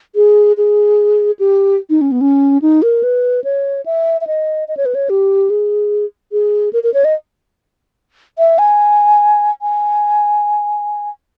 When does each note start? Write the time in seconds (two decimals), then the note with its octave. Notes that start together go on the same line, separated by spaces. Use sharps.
0.15 G#4
0.57 G#4
1.39 G4
1.90 D#4
2.01 C#4
2.12 B3
2.21 C#4
2.62 D#4
2.82 A#4
3.03 B4
3.44 C#5
3.86 E5
4.21 E5
4.27 D#5
4.68 D#5
4.77 C#5
4.85 B4
4.95 C#5
5.10 G4
5.50 G#4
6.32 G#4
6.73 A#4
6.83 A#4
6.94 C#5
7.05 D#5
8.38 E5
8.58 G#5
9.62 G#5